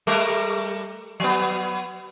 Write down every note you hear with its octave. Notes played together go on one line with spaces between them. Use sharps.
G3 A3 A#4
F#3 B3